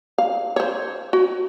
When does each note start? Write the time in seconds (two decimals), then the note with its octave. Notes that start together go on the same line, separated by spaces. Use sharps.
0.18 F5
0.56 C5 C#5
1.13 F#4